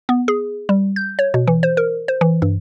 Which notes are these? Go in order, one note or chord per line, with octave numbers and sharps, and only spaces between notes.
B3
G#4
G3
G6
C#5
B2
E3
C5
A#4
C5
E3
G2